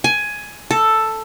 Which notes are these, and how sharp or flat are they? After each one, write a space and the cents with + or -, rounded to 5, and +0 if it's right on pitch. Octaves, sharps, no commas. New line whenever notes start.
G#5 +10
A4 +5